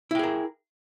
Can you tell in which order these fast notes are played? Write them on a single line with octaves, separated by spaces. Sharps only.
E4 G5 G#4 A#4